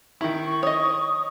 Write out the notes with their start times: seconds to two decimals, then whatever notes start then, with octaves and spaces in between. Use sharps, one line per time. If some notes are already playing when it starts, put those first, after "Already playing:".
0.21 D#3 E4 A#5 C#6
0.63 C#5 D#5 D#6